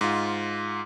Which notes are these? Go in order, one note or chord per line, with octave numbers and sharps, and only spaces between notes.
G#2 F4